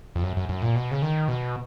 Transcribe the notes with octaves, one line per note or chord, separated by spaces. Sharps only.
F2
F#2
F#2
F#2
A#2
B2
C#3
D#3
B2